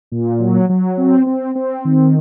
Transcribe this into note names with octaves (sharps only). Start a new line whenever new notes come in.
A#2
F#3
F#3
C4
C4
C4
D#3